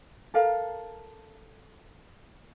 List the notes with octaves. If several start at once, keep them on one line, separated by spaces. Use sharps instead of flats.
A4 A#4 F5